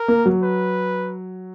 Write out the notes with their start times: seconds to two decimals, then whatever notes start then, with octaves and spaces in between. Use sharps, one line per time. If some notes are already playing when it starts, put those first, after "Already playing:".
Already playing: A#4
0.08 A#3
0.26 F#3
0.43 B4